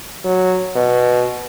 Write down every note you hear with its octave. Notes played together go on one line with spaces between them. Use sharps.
F#3
B2